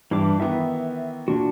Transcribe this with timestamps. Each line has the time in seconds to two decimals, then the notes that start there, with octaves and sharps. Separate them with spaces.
0.11 G2 E3 D4 D6
0.40 D#3 E3 B3 E5
1.28 A#2 D4 F#4